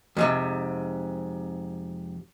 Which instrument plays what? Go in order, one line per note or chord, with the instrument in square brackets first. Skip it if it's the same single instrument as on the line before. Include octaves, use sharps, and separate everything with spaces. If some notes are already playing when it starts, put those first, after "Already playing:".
[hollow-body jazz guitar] F2 G#2 C3